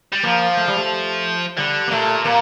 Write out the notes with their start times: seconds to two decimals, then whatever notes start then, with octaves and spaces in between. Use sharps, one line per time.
0.13 G3
0.23 F3 A#3
0.57 A3
0.68 G3
0.78 A3
1.58 D3 G3
1.88 A#3
1.91 A#2 A3
2.25 A#2 A#3